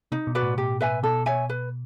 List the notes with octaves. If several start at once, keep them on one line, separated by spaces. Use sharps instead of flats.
C3 D#4
B2
F#4 B4 D5
A2
B2 G4
B4 E5 G#5
B2 A4
C#5 E5 G#5
B4